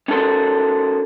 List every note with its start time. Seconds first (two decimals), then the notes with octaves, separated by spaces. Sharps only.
0.08 C#4 D#4 F#4 A4 A#4 C5